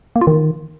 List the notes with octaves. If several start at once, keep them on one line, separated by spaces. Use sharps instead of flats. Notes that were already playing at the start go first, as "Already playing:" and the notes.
A#3
F4
D#3